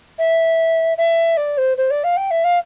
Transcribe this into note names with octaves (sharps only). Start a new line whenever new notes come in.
E5
E5
D5
C5
C5
D5
F5
G5
E5
F5